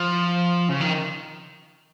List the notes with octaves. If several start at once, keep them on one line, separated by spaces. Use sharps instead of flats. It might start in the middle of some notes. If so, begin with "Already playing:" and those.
Already playing: F3
C#3
D#3